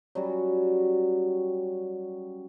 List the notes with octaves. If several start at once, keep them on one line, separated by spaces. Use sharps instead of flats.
F#3 G3 C#4 F#4